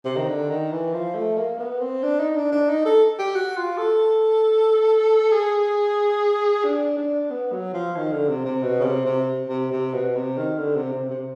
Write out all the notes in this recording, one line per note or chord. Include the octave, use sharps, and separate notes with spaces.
C3
D#3
D3
D#3
E3
F3
A3
A#3
B3
C4
D4
D#4
D4
D4
D#4
A4
G4
F#4
F4
A4
G#4
D4
D4
B3
F#3
F3
D#3
D3
C3
C3
B2
C#3
C3
C3
C3
C3
B2
C3
D#3
D3
C3
C3
C3